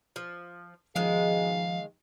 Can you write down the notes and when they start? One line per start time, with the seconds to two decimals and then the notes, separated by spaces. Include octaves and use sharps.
0.16 F3
0.96 G#2 B2 D#3 F3 G#3 G#4 F5